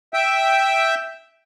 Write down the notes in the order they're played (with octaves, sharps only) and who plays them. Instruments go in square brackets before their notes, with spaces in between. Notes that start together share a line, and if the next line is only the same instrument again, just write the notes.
[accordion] E5 G5